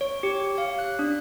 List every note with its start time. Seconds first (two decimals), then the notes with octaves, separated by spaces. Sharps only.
0.01 C#5
0.23 G4
0.58 F5
0.79 F#6
0.99 D4